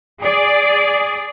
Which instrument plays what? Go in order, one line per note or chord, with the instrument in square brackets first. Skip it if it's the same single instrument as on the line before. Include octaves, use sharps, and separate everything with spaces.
[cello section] G#4 D5